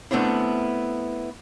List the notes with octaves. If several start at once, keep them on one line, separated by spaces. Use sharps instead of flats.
A3 B3 C4 D4 E4